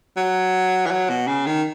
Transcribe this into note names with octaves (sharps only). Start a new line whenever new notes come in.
F#3
E3
F#3
B2
C#3
D#3